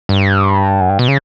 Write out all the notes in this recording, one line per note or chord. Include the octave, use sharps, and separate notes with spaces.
G2
F#2
G2
B2
C#3